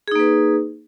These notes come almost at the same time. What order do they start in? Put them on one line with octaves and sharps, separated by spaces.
G#4 D#4 A#3 B4